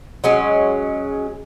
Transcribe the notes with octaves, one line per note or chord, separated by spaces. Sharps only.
F#3 G#3 C#4